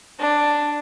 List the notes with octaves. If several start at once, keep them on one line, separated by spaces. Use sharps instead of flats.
D4